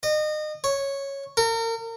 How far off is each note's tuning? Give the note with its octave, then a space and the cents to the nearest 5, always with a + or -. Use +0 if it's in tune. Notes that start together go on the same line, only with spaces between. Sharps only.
D#5 -30
C#5 -5
A#4 -35